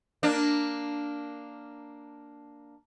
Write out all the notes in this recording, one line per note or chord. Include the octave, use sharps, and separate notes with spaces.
A#3 D4